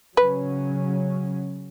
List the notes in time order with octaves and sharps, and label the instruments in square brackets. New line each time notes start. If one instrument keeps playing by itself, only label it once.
[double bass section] C#3 F#3 C#4 [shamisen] B4